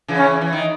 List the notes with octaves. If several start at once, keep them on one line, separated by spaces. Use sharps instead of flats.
C#3 E3
C#4
E3
D#3